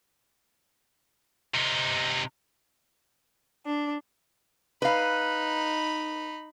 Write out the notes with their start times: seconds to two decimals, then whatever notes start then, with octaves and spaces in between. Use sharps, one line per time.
1.54 C3 D#4
3.66 D4
4.82 D#4 B4 F5 B5